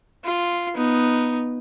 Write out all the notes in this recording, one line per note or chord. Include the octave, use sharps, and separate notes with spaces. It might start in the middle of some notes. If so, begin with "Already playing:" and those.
F4
B3 D#4